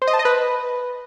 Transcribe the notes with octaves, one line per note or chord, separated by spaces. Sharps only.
C5
D#5
A5
D#5
B4